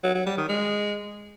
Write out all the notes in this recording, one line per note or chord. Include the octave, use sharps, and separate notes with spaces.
F#3
F#3
G3
D#3
G#3